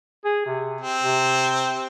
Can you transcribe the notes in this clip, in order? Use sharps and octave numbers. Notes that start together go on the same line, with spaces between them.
G#4
C3
C4
C3